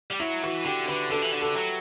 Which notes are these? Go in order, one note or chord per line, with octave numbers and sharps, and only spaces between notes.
G3
F#3 E4
E3 F#4
D3 G4
D3 B4
D3 A4
E3
D3
A4
F#3